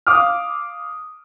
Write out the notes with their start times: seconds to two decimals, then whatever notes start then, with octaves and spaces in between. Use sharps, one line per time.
0.07 F5 D6 D#6 F6